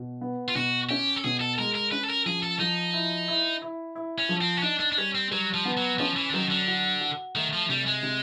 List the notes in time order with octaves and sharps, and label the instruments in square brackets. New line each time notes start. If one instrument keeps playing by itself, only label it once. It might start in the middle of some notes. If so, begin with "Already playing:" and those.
Already playing: [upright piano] B2
B3
[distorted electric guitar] F4
[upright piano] B2 [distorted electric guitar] F#4
[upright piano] C#4 [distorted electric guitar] G4
[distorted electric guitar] A4
[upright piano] B2 [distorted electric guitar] G#4
[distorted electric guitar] A4
[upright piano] G#3 [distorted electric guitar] A#4
[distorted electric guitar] A#4
[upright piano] C#4 [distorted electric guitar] B4
[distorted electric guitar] A4
A#4
[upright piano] F3 [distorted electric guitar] G#4
[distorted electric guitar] A4
[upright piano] F3 [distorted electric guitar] D#4
[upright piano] E4
E4
E4
E4
[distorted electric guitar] C#4
[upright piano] F3
[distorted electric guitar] C4
C#4
[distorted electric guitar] D4 [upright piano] D#4
[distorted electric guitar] D4
D4
[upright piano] G3 [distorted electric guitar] C#4
[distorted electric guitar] C4
[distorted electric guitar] F#3 [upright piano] G3
[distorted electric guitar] F3
[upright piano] B3
[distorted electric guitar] F#3
[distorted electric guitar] F3 [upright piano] C#4
[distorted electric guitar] E3
D3
[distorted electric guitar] D#3 [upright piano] F#3
[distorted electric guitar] D3
[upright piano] F#4
F#4
[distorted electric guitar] D#3 [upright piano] A3
[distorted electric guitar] F3
[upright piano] C3 [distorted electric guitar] G3
[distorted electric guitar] G#3
[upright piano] C3